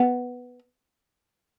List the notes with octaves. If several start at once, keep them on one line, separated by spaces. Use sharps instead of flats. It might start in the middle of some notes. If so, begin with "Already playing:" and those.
Already playing: B3